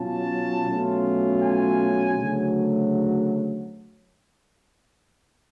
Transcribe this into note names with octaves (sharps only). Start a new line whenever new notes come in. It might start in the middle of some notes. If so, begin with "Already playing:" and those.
Already playing: B2 F#3 C#4 F4 A5
B2 F#3 A3 C#4 F4
G#5
D2 C#3 F#3 A3